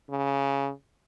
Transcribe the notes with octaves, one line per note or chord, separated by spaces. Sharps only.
C#3